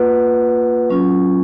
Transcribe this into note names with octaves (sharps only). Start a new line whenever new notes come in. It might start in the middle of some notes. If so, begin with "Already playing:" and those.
Already playing: A#3 F4 B4 F#5
F#3 C#4 F4